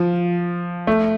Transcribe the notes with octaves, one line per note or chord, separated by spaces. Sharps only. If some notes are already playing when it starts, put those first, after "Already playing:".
Already playing: F3
A3